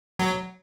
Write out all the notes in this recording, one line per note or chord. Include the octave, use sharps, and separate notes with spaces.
F#3